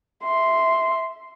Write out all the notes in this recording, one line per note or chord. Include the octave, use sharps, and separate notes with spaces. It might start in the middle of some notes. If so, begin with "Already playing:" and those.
E5 C6